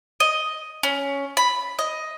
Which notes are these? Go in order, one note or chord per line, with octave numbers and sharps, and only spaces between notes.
D#5
C#4
B5
D#5